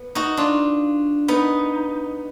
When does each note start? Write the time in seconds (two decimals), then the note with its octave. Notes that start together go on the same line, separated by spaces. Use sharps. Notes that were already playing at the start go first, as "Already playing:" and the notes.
Already playing: B3
0.15 D#4 F#4
0.37 D4 F4
1.28 B3 D#4